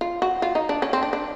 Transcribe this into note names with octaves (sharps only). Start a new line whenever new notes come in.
F4
F#4
F4
D#4
D4
C#4
C4
D4
D4